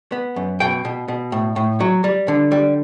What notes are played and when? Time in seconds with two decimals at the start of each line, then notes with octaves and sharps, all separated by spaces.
0.12 B3
0.36 F#2
0.60 B2 G5
0.85 B2
1.08 B2
1.32 A2
1.56 A2
1.80 F#3
2.04 G3
2.28 D3
2.52 G3